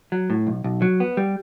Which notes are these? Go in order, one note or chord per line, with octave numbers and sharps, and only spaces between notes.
F#3
A2
B1
B1
F#3
B3
G3